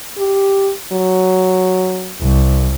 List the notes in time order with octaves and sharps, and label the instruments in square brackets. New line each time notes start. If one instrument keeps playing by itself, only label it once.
[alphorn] G4
F#3
[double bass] C2